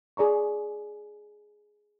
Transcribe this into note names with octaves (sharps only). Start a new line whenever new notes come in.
G#4 D5 A#5 C#6